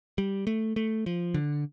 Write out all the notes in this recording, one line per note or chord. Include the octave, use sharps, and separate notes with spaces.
G3
A3
A3
F3
D3